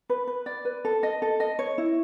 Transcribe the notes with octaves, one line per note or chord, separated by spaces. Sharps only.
B4
B4
D5
B4
A4
D#5
A4
D#5
C#5
E4